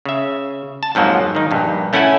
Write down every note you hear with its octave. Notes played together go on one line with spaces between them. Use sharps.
C#3 E5
A5
F2 G#2 F3 F#3 A#3
D#3 D#4
A#1 G2
A3 C#4 E4 A4 F#5 G#5